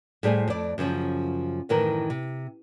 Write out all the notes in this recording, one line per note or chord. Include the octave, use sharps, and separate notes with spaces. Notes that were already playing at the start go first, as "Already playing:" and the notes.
A2 G3 G#4 C5 G#5
F2 D5
F#2 C#3 E3 F3
F#2 A2 D#3 E3 A#4
C3